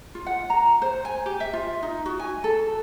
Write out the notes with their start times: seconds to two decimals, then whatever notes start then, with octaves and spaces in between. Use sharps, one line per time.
0.15 F4
0.26 F#5
0.50 A#5
0.82 C5
1.05 G#5
1.26 G4
1.40 E5
1.53 F4
1.83 D#4
2.06 F#4
2.19 G#5
2.44 A4